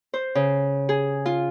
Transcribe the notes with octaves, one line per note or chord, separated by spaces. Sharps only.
C5
C#3
G#4
F4